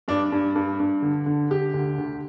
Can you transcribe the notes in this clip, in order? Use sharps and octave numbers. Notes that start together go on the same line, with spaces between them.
G2 D4
G2
G2
G2
D3
D3
D3 G4
D2
D2